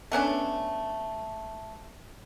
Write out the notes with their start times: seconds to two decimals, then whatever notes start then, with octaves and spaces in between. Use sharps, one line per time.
0.12 A3 B3 C#4 D4